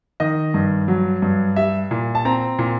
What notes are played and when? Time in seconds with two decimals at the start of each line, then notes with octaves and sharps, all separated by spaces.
0.20 D#3 D#5
0.54 G2
0.88 F#3
1.22 G2
1.56 G3 E5
1.91 A#2
2.15 A5
2.25 C4 A#5
2.59 A#2